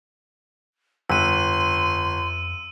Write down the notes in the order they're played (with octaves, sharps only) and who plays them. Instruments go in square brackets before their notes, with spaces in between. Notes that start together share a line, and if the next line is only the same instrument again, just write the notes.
[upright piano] G1 [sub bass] F2 [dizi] C6 [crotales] E6 D#7